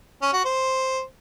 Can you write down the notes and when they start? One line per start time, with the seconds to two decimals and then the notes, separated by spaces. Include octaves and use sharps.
0.22 C#4
0.33 F#4
0.45 C5